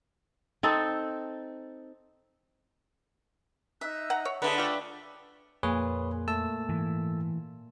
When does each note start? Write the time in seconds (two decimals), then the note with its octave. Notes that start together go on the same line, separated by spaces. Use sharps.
0.63 C4 D#4 A4
3.81 D#4 E5 E6 F#6
4.10 F#5 A#5
4.25 C#5
4.42 D3 G#4 B4 E5 A5
4.58 A3 F4 G5 D6
5.63 F2 A#2 G#4 B4 C#5
6.28 A3 A5 E6
6.69 G#2 E3